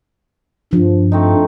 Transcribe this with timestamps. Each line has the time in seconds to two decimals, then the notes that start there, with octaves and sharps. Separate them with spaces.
0.73 G2 F3
1.12 A3 C4 D#4